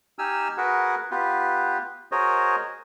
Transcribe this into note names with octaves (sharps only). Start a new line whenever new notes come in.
D#4 G4 G#5 E6 F6
F#4 G#4 A#4 B4 F#5
B3 F4 G4 B4
F#4 G#4 A#4 C5 C#5 D#5